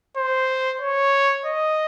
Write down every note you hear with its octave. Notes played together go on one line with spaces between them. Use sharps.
C5
C#5
D#5